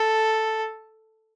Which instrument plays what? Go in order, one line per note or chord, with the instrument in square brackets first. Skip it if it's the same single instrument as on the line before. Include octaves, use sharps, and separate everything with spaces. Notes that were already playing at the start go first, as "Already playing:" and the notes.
Already playing: [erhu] A4